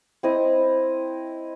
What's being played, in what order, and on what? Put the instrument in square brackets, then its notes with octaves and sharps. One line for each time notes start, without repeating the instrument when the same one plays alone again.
[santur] C4 E4 D#5